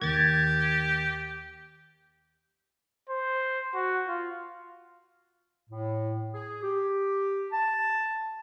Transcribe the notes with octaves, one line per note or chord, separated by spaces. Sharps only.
D#2 G4 G#6 A6
C5
F#4
F4
A2
G#4
G4
A5